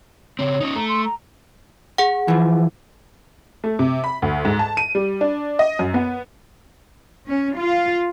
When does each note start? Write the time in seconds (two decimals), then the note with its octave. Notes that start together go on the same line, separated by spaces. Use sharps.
0.39 C#3 C4 C#5
0.61 C#4 D#4
0.75 A3 A#5
0.88 C6
1.05 A#5
1.98 G#4 F#5
2.28 E3 F3
3.64 A3
3.79 C3
4.04 B5
4.22 D2
4.45 G#2
4.59 A5
4.77 D#7
4.95 G3
5.21 D4
5.59 D#5
5.79 F#2
5.94 B3
7.28 C#4
7.58 F4